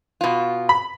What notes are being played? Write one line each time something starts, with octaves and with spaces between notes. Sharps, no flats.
B2 F4
B5